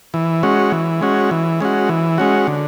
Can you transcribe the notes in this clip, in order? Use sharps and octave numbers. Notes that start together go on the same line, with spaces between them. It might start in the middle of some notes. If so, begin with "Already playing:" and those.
E3
G#3 C#4 F#4
E3
G#3 C#4 F#4
E3
G#3 C#4 F#4
E3
G#3 C#4 F#4
D3